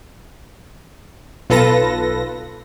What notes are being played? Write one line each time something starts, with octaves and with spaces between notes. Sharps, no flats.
B1 F4 A4 B4 A#6